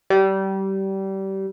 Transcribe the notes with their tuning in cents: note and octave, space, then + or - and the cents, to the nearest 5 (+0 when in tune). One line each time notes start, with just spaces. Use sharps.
G3 -25